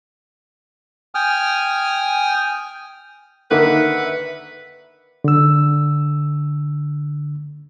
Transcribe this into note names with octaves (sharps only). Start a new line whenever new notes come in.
G5 G#5 D#6 F6
D3 D#3 A#3 B4 E5 F#5
D3 E6